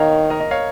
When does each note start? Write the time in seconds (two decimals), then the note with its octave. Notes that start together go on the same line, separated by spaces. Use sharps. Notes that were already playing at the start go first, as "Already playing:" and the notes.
Already playing: D#3 C#5 F5 A#5
0.30 A#4 D#5
0.40 D#5
0.51 C#5 F5